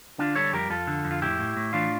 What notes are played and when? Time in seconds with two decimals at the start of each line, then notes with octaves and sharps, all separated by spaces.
0.18 D3 D4 F4
0.36 G3 A4 C#5
0.53 F2 G4 A#4
0.70 F2 F4 A4
0.87 D3
1.05 F2
1.11 F4
1.22 A2 E4 G4
1.39 A2
1.57 A2
1.73 E3 D4 F4